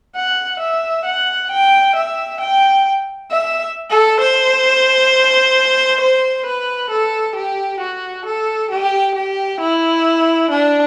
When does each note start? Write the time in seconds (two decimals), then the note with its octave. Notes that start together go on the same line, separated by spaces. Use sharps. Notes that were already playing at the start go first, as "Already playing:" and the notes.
0.15 F#5
0.60 E5
1.05 F#5
1.51 G5
1.96 E5
2.41 G5
3.31 E5
3.90 A4
4.20 C5
6.00 C5
6.46 B4
6.90 A4
7.36 G4
7.80 F#4
8.26 A4
8.71 G4
9.15 G4
9.60 E4
10.51 D4